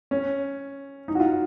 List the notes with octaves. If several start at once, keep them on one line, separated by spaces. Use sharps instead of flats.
C#4
D#4
F#4
F4